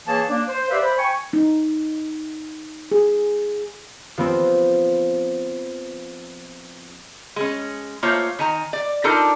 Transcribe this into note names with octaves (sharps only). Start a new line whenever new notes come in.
E3 A#3 G#4 C#5 A5
A#3 D4
C5
G4 B4 D5 E5 F5
C5 B5
G5 G#5 C#6
D#4
G#4
F3 B3 C4
G#3 C#4
A3 A#3 F4 C5 C#5
D#3 G#5 A#5
D5
D4 D#4 F4 A4 A#4